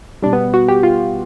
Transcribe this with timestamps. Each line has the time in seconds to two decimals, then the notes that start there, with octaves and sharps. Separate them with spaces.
0.22 B2 G3 D4
0.33 B3
0.54 F#4
0.68 G4
0.83 F4